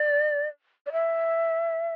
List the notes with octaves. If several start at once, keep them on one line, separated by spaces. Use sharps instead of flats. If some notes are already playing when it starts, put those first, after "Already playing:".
Already playing: D5
D5
E5